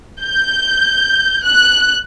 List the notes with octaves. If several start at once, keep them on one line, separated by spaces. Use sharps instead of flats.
G6
F#6